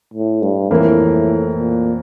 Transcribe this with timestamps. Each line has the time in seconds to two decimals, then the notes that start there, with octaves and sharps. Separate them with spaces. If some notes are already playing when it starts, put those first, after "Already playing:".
0.14 A2
0.42 G2
0.71 F2 A2 E3 A#3
1.55 A#2